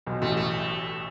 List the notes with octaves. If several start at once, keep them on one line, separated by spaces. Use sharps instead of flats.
B1 B2
A1 A2 A3
A3
A3